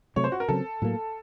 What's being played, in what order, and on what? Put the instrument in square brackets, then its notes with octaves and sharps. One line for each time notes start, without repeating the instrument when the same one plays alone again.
[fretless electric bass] C3 F#3 A3 [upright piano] C#5
[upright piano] C5
F#4
A#4
[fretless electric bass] C#3 F#3 C4 [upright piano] A4
[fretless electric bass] A2 F#3 A#3